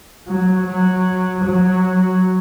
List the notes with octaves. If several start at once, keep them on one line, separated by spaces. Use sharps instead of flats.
F#3
F#3
F#3